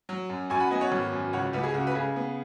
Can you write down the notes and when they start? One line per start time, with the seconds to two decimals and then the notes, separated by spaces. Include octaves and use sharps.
0.09 F#3
0.30 F#2
0.50 F#2 G#5 C#6
0.60 F#5 B5
0.71 B3 D#5 G#5
0.81 C#5 F#5
0.92 G#1
1.12 F#2
1.33 C#2 C#5 F#5
1.53 C#2 F#4 B4
1.64 G#4
1.74 C#3 F#4
1.87 B4
1.95 C#3 G#4
2.16 B3